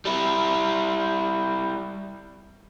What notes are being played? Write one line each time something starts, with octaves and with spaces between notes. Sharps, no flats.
G3 E4